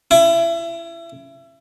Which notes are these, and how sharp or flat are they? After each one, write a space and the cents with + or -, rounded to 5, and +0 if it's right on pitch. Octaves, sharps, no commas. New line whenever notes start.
E4 +30